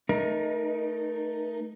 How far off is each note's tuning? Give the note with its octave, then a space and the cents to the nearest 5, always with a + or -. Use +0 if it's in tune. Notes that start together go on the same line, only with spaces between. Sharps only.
A3 +0 D#4 -5 A#4 +35